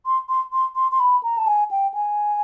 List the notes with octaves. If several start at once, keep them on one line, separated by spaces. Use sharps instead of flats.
C6
C6
C6
C6
C6
B5
A#5
A5
G#5
G5
G#5